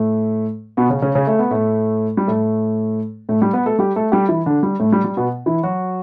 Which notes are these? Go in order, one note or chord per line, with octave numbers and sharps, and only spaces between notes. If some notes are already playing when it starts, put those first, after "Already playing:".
Already playing: A2 A3
B2 B3
C#3 C#4
C#3 C#4
C#3 C#4
A3
B3
A2 A3
G3
A2 A3
A2 A3
G3 G4
B3 B4
A3 A4
G3 G4
A3 A4
G3 G4
E3 E4
D3 D4
G3
A2 A3
G3
G3
B2 B3
E3 E4
F#3 F#4